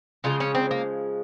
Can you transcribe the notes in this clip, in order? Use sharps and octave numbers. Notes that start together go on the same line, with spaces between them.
C#3 F3 G#3 F4
C#4
C4
A#3